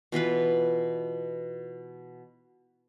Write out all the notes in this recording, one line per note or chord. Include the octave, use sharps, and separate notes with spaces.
B2 E3 F4 B4